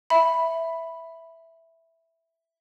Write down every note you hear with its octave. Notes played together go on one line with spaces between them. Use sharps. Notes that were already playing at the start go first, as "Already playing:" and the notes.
E5 B5